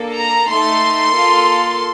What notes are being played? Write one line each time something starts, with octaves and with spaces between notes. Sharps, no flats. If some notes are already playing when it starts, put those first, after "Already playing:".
Already playing: A#3 D4 A4
A#5
A3 D#4 A4 C6
A#3 F4 A4